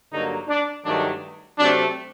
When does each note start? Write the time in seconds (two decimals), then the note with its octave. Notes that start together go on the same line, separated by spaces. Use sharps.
0.11 G2 D3 F#3 A#3 D#4
0.47 D4
0.84 G2 D#3 F#3 A3 D4
1.58 C3 F#3 A3 C4 D4